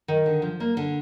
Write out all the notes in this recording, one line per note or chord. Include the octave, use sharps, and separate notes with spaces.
D#3
D3
F3
A#3
D3